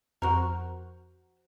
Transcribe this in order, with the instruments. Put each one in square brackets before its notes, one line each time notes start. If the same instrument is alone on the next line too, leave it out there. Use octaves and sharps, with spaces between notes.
[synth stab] F2 F#4 [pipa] A#4 C5